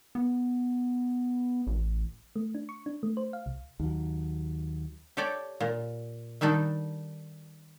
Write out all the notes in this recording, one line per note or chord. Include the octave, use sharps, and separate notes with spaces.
B3
A1
A3
D4
C#6
D4
A3
C5
F5
C2
D#2 F#3
G4 A4 C#5 D5 G5
A#2
D#3 G3 D4 D#4 A4